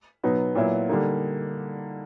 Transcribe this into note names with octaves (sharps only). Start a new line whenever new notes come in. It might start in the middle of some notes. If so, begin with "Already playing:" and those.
B2 F#3 B3 D#4
A#2 F#3 B3 E4
D3 G3 A#3 D#4